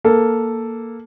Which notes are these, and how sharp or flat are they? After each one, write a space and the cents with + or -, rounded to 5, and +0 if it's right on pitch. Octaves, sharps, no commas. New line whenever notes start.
A#3 +0 A4 +0